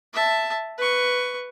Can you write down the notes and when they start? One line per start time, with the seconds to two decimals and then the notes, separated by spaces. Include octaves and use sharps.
0.13 E5 A5
0.78 B4 C#6